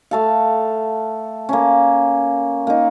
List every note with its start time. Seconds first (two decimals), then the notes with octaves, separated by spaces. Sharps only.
0.11 A3 A4 F5
1.49 A#3 C#4
2.67 A#3 D#4